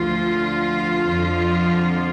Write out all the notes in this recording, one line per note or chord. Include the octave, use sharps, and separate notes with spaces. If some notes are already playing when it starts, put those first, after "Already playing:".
Already playing: D2 D3 F3 F4
F2 D3 F3